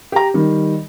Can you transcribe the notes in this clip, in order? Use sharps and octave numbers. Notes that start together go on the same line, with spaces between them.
G4 A#5
D#3 G3